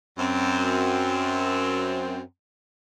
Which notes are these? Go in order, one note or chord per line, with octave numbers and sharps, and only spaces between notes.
F#2 C4